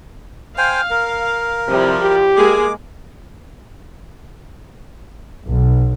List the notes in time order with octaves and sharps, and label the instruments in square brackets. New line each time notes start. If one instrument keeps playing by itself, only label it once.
[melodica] C5 G5 G#5 [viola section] F5
[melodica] A#4
[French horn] C3 [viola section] F3 G3 E4
[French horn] G4
[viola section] G#3 A#3 G#4 [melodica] D6
[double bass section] B1